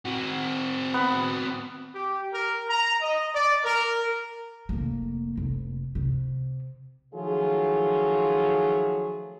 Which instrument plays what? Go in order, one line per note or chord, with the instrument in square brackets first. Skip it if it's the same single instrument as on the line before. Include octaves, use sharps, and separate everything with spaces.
[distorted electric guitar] C4 F#4
[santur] B3
[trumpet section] G4
A#4
A#5
D#5
D5
A#4
[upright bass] F1 A#3
F1
C3
[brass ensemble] D#3 F3 F#3 A3 F4 G#4